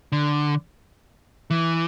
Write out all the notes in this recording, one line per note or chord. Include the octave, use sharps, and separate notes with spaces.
D3
E3